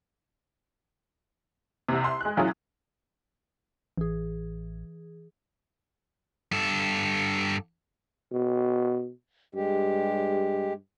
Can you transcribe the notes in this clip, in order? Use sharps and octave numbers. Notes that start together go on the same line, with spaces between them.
C2 C3
C6
G#3 F#6
A#2 F#3 C#4 E4 F4 G#4
A1 E3 G#4
G2 A4
B2
G2 G#3 G4